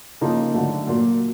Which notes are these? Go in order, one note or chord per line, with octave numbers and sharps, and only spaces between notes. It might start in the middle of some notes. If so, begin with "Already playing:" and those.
C#3 F3 A#3 D#4
D3 F#3 A3
A#2 F#3 A#3